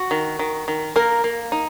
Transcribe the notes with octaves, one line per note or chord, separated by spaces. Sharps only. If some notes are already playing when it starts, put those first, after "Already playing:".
Already playing: F#4
D#3
D#3
D#3
A#3 A#4
A#3
D#4